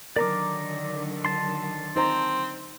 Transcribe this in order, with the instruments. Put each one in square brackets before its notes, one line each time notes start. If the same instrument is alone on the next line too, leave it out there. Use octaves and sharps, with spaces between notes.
[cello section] D3 D#3 F#3 [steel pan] A#4 [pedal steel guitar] D5 A#5 D6
[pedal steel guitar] A5 C6
[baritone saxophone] C4 [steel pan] D#4 C5 A#5